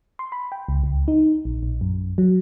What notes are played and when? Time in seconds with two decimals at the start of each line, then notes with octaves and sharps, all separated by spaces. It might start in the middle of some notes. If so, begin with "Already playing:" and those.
0.19 C6
0.32 B5
0.52 G5
0.68 C#2
0.83 C#2
1.08 D#4
1.45 A#1
1.63 A#1
1.81 F#2
2.18 F#3